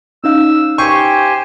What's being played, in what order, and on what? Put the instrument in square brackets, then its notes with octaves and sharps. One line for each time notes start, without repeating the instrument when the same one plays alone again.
[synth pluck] C#4 D#4 F5 [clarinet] E6
[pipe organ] G4 C5 G#5 [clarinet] G5 [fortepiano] C#6